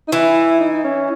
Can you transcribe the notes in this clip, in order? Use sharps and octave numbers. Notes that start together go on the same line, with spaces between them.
D#4
E3 E4
D#4
D#4
C#4